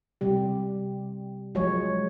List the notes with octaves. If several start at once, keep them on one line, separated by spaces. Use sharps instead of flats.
C3 G3 G4
F3 F#3 G#3 C#5